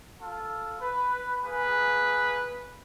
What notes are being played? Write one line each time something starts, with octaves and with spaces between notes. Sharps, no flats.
F4 A4
B4
A#3 G#4 B4